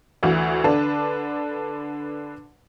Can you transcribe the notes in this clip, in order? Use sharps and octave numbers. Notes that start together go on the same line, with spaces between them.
D2 E3 F#4
D3 D4 B4 A5